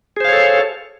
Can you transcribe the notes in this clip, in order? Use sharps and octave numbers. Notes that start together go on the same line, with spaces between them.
G#4 A4 C5 C#5 F5